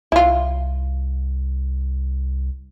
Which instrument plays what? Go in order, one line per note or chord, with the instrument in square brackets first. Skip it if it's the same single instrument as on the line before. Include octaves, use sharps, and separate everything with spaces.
[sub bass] C2 [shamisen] E4 F4